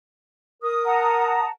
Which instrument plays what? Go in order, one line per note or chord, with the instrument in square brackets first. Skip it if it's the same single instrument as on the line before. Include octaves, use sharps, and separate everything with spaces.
[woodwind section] A#4 D#6
[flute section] F#5 A5 A#5